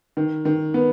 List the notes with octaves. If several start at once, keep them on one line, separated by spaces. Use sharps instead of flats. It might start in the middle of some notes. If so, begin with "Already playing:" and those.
D#3
D#3
B3